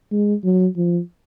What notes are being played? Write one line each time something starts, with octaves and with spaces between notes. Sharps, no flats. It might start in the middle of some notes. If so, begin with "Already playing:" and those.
G#3
F#3
F3